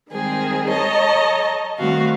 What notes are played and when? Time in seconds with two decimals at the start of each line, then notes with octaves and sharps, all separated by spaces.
0.10 D#3 G3 G#3 C4 G#4
0.69 A4 C#5 D#5 A5 A#5
1.79 D#3 G3 A3 C4 F#4 F5